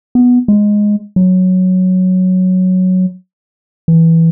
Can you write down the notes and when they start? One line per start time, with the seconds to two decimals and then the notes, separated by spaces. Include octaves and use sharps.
0.15 B3
0.48 G#3
1.16 F#3
3.88 E3